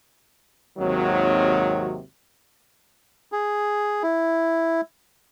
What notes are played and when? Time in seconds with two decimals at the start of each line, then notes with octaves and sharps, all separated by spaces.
0.79 G#1 D#2 C3 D#3 F#3
3.32 G#4
4.03 E4